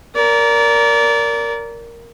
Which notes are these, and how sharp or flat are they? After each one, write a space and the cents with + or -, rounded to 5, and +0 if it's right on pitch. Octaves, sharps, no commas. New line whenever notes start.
A#4 +0 D5 -25